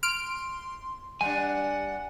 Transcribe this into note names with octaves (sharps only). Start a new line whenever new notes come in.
C6 F6 D7
G3 D4 F#5 G#5